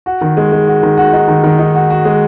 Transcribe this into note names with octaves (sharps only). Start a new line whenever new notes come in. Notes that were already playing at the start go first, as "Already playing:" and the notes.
F#4
D#3
G#3
G#3
F#4
D#3
F#4
D#4
D#3
D#3
D#4
F#4
F#4
G#3